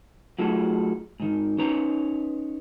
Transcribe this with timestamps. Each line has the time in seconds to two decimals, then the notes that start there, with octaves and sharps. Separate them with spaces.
0.39 F#3 A3 F4 F#4 G#4 A4
1.20 G#2 D#3
1.58 C#4 D#4 B4 C#5 A#5